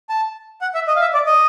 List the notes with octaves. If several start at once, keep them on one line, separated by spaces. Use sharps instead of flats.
A5
F#5
E5
D#5
F5
E5
D5
D#5